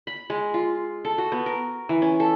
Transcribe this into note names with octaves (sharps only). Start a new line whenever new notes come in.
B5
G#3
F4
A4
F#4
B3
A#4
E3
C#4
A4